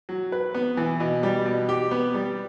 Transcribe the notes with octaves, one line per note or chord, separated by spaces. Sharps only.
F#3
B4
B3
E3
B2
G3
B2
G4
B3
G3